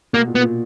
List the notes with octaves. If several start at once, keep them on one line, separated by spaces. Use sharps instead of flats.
B2 A#3
A#2
B3
A#2